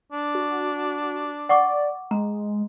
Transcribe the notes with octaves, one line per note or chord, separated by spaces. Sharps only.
D4
F#4
D5 F#5 C#6 D6
G#3 A#5